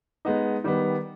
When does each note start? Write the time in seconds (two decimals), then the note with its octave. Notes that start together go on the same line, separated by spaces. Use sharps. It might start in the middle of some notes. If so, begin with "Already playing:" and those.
0.25 G#3 B3 D#4
0.64 D#3 G3 B3